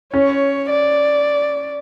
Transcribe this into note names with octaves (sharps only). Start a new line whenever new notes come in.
C#4 C#5
D5